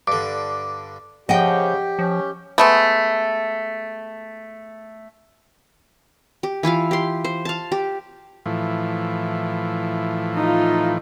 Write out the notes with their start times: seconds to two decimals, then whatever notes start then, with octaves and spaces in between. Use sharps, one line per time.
0.07 G2 D3 D6
1.29 C#3 F3 G4 D#5 F#5 G5
1.99 F3 C#4
2.58 G#3 A3 B3
6.43 G4
6.63 E3 E4 F4 F5
6.91 G4 C6
7.24 C5
7.45 F5 A5
7.72 G4
8.46 A2 E3 F3
10.35 D#4 F4